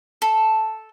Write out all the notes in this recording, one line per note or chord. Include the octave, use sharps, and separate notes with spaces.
A4